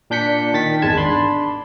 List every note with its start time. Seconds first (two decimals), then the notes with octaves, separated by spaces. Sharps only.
0.10 A#2 D4 G6 B6 C#7
0.54 D#3 A6 B6
0.82 G#1 E2 G#3 A5 G#6
0.97 D4 B5 C6